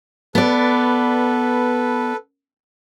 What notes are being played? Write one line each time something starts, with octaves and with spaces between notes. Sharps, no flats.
B3 A4 B4 D5